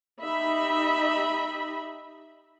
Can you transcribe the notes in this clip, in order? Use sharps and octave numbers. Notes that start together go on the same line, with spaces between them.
D#4 G4 D#5 E5 B5